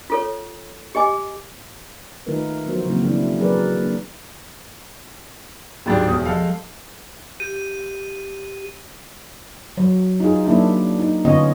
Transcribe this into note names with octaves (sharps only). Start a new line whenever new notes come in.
F4 A4 C#5
G4 D#5 G#5 D6
D#3 A3 D#4 F4 A#4 B4
F3 F#3 B3 F#4 A#4 C5
C#3 E3 F#3 A#3 C4
C#3 E3 A#3 C4 D4 E4
F#3 G#4 A#4 B4 D5
A#3 D4
D1 G#2 G3 D4 G5 A6
E1 E2 D#6
F3 G#3 A4 F5
G4 D#7
F#3
D#4 F4 G#4
F#3 A#3 D4 E4
D#4
D3 B3 C#4 F4 C#5 D#5